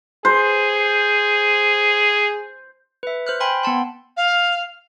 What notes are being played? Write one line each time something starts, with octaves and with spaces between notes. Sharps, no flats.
G#4 C5
B4 E5
C5 F6 F#6
G5 G#5 B5 C6
B3 G5 A5 C6
F5